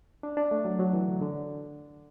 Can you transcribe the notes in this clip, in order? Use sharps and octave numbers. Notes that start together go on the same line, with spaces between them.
D4
D4
A3
F#3
F#3
E3
D3
D3